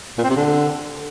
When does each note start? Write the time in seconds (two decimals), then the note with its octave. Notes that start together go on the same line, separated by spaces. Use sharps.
0.18 A#2
0.24 C4
0.30 C3
0.36 D3